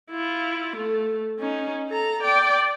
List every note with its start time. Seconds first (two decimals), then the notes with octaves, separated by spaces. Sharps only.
0.11 E4 F4
0.76 A3
1.39 C#4 D#4
1.90 A4 A#5
2.22 D5 G5